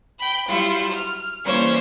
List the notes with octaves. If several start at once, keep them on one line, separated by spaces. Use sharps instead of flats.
G5 B5
F#3 G3 E4 F4
F6
E3 G3 A#3 C#4 C5 C#5